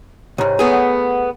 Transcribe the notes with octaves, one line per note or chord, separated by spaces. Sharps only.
C2 G#2 C#5 A#5
A3 B3 G#4
F#5